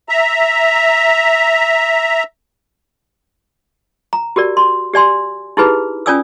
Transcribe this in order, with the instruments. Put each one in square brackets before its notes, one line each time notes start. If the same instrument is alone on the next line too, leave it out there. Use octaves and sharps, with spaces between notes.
[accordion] E5 A#5
[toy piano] A#5
F#4 G4 A#4 D5
C6
G4 D5 G#5 C6
D#4 E4 G4 G#4 B4 B5
C#4 F4 D5 G#5 D#6 E6